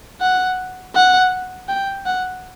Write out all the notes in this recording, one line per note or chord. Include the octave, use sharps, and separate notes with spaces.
F#5
F#5
G5
F#5